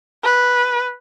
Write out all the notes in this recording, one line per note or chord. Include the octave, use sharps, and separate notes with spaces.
B4